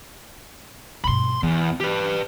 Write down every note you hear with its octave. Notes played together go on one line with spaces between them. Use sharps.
G2 B2 B5 C6
E2 E3
G4 B4